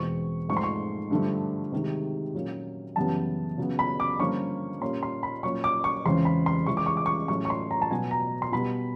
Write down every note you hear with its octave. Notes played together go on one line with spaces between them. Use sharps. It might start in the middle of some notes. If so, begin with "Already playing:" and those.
Already playing: E2 B2 G#3 C4 C#6
G#2 F3 A3 C4 C#6
C6
C#6
G2 D3 F3 A3
C3 D#3 G#3
A#2 F#3 A#3 C#4
F#2 C#3 E3 G3 B3 A5
C#3 F#3 B3
B5
D6
G2 D3 F3 A#3 C#4 C#6
A#2 G3 A#3 C#4 C6
C6
B5
A#2 F#3 A#3 C#4 C#6
D6
C#6
E2 C#3 E3 G#3 C4 C6
B5
C6
C#3 E3 G#3 C#6
D6
C#6
D6
C#6
A2 F#3 A3 C#4 C#6
C#6
C6
A#5
A5
B2 F#3 B3 G#5
A#5
C6
B2 G3 B3 B5